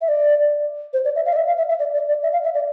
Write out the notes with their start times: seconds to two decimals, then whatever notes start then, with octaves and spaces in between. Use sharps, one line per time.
0.01 E5
0.08 D5
0.93 C5
1.05 D5
1.15 E5
1.25 F5
1.32 D5
1.36 E5
1.47 F5
1.57 E5
1.69 E5
1.79 D5
1.94 D5
2.08 D5
2.23 E5
2.32 F5
2.44 E5
2.54 D5